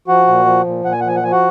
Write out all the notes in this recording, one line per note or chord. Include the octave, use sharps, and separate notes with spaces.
F3 F#4 F#5
A#2
F3
A#2
A#2 F#5
G#5
F#5
F3 G#5
F#5
F3 G#5
F#4 F#5